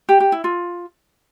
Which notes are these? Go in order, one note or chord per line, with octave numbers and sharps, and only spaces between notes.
G4
G4
E4
F4